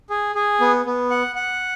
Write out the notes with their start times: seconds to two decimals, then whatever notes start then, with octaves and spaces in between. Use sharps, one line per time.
0.10 G#4
0.35 G#4
0.60 B3
0.86 B3
1.10 F#5
1.35 F#5